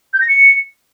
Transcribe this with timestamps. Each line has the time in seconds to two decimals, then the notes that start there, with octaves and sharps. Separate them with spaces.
0.13 G6
0.21 A#6
0.28 C#7